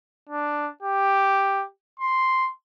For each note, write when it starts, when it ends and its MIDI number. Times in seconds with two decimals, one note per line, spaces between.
0.29 0.67 62
0.83 1.64 67
2.00 2.48 84